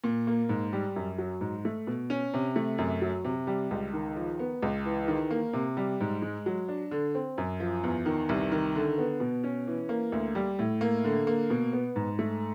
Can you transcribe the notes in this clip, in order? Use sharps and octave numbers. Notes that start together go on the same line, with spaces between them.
A#2
A#3
G#2
G3
F#2
F#3
G#2
A3
B2
C#4
C3
A3
F#2
F#3
C3
G3
C#2
D#3
F3
B3
C#2
E3
D#3
A#3
C3
G3
G#2
G#3
F#3
D4
D3
C4
F#2
F3
E2
D#3
C2
D#3
D3
B3
B2
C#4
E3
A#3
D2
G3
A2
A#3
D3
A#3
B2
B3
G#2
A3